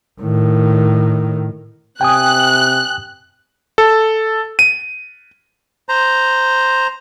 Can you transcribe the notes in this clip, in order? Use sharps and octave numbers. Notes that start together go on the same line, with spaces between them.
A2 D#3
C3 G5 G#5 D#6 F#6
A4
D#7
C5 A#5